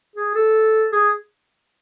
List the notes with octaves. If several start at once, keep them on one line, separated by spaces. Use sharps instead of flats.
G#4
A4
G#4